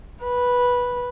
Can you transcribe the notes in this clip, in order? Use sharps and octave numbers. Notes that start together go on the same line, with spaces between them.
B4